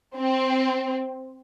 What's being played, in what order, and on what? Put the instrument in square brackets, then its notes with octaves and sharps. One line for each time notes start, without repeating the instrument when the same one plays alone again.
[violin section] C4